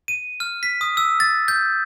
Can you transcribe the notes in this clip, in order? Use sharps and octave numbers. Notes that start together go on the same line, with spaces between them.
D#7
F6
B6
D#6
E6
A6
G6